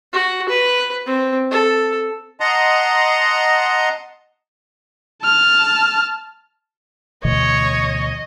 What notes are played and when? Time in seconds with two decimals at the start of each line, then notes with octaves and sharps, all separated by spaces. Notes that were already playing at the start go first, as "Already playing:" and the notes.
0.13 F#4
0.49 B4
1.06 C4
1.51 A4
2.40 D#5 F#5 A5 A#5 C6
5.23 A5 F6
7.25 D2 B2 E3 C#5 D#5